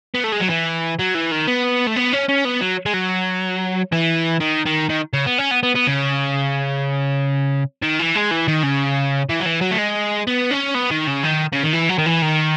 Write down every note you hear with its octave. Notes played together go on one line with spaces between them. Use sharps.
B3
A3
G#3
F#3
E3
F#3
E3
D#3
B3
A3
B3
C#4
C#4
B3
F#3
G#3
F#3
E3
D#3
D#3
D#3
C#3
B3
C#4
B3
B3
B3
C#3
D#3
E3
G#3
E3
D#3
C#3
E3
F#3
E3
F#3
A3
G#3
B3
C#4
B3
D#3
C#3
D#3
C#3
D#3
E3
F#3
D#3
E3
D#3